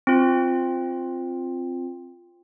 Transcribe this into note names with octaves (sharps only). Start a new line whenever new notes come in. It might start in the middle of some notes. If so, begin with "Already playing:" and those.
C4 F4